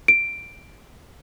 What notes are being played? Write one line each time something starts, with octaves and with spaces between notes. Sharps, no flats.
D7